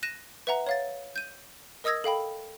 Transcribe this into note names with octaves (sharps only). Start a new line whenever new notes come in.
F#6 A#6 D#7 E7
B4 E5 F#5 A#5
C#5 F5 A6
G6 D#7
A#4 D#5 D#6 E6 G#6 A#6
A4 F5 G5 B5